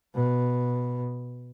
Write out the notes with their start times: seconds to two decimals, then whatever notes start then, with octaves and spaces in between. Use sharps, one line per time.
0.15 B2